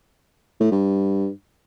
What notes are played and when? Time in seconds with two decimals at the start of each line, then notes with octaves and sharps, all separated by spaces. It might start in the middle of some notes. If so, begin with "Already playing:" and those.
0.60 A2
0.71 G2